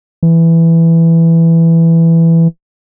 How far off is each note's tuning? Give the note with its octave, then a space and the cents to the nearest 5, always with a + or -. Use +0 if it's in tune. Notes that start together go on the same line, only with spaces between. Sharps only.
E3 +5